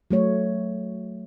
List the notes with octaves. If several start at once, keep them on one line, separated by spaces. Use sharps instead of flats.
F#3 A3 C#5